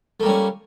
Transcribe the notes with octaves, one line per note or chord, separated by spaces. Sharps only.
G3 A3 A#3 C#4